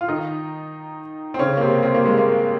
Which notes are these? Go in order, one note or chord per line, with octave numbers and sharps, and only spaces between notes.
F4
D#3 D#4
C4
C#3 C#4
A#3
C3 C4
C4
A#3
G#3
A#3